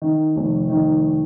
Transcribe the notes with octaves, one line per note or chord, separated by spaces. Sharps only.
D#3
F1
D#3